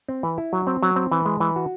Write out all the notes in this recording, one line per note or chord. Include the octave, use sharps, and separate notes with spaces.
C4
E3
E4
F#3
C4
F#3
C4
E3
G#3
E3
F#4